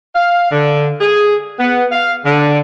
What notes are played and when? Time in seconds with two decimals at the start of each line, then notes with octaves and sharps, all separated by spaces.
0.16 F5
0.51 D3
1.01 G#4
1.60 B3
1.92 F5
2.25 D3